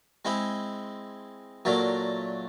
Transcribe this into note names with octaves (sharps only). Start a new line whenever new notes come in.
G#3 C4 E4
A#2 F#3 A3 D4